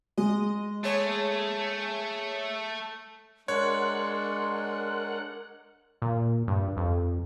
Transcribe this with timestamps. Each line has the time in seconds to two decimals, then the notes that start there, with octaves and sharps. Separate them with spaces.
0.18 G#3 D#5
0.84 A3 G#4 C#5
3.48 G#3 D4 A#4 C#5 F#5 C6 F#6
6.02 A#2
6.48 G2
6.77 F2